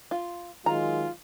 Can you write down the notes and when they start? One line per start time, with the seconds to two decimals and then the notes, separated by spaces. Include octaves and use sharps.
0.11 F4
0.66 D#3 F#3 G#3 F4 A#5